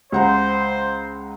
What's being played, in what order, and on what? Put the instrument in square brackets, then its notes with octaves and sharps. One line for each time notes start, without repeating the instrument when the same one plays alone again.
[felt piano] C#2 F#5 A#5 [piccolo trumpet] C5